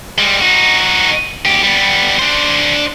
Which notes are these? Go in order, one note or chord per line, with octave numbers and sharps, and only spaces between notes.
G3 G#3
D#4 F#4
D2 G4
G3 B3
D4 C5